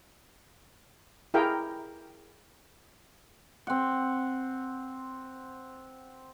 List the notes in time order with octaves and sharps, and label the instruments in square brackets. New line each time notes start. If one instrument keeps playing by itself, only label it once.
[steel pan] E4 G4 G#4 A#4 F5 G5
[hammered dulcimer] C4 F#5